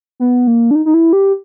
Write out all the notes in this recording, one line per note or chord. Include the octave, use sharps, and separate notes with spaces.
B3
A#3
D4
D#4
D#4
E4
G4